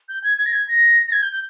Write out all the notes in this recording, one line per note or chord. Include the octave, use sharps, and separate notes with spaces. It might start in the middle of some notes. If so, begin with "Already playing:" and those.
G6
G#6
G#6
A#6
G#6
A#6
A#6
G#6
G6
G6